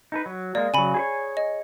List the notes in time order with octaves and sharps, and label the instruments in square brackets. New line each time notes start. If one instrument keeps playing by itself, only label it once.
[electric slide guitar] D#4 A4 B4
F#3
[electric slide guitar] G#3 A#3 [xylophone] D5
[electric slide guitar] C#3 F#3 [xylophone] G#5 B5
[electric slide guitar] G#4 C5 C#5
[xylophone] D#5